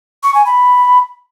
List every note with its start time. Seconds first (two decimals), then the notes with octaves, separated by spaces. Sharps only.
0.23 C#6
0.34 G#5
0.45 B5